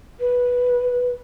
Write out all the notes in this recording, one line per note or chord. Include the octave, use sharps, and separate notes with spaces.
B4